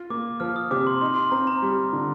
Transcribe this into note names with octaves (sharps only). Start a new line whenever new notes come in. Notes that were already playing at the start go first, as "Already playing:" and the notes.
Already playing: F4
A#3 D6
F3 F6
D#6
C3 D6
C6
D#4 C6
C6
C4 A#5
A#5
G3
D3